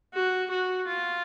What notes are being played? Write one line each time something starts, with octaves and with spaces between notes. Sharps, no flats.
F#4
F#4
F4